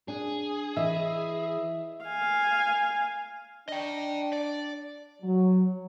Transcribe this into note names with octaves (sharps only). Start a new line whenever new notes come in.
D4 G#4
E3 D#5 E5
F5 G#5
D4 D#5 G5
D5
F#3